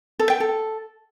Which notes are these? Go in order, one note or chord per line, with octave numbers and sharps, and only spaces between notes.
A4
G5
A4